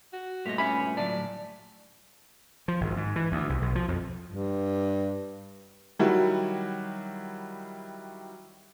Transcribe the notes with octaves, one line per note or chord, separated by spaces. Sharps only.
F#4
G2 A#2 A3 G4 D#5
C#4 G4 E5 B5
A2 D3 F#3 D5 A5
F3
G#1
G#2
E3
D2
C2
B1
F3
F2
G2
D#3 F#3 G3 E4 F#4